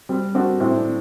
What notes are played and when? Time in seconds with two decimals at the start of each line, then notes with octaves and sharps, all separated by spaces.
0.09 G3 C4
0.35 C4 D4 F#4
0.60 A2 C4
0.78 D4